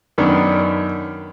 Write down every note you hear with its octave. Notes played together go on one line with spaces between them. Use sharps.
F#2 D#3 B3 D4